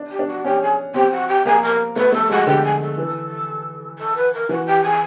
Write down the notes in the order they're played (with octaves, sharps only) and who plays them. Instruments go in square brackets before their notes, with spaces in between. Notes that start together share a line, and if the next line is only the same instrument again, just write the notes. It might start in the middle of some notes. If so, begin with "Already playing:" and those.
Already playing: [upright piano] D4
[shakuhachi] G4
[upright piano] D4
[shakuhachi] F#4
[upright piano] C#4 [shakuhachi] G4
[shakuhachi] G#4
[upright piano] C4 [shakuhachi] G4
[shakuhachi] F#4
G4
[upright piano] A#3 [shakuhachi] G#4
[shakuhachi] A#4
[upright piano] A3 [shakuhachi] B4
[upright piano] A3 [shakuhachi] A4
[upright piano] G#3 [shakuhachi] F#4
[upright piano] D3 [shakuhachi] G4
[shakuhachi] G#4
A4
[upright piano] E3
[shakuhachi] A4
B4
A#4
[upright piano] E3 [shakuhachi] F#4
[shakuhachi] G4
G#4